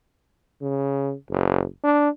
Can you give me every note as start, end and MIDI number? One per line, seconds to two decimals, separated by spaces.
0.62 1.13 49
1.30 1.64 30
1.84 2.09 62